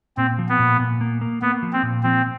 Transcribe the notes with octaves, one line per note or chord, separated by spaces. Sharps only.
A#2 C4
F3
B3
A#2
A#2
A#3
A#3
A#3 B3
F3
C4
A#2
F3 C4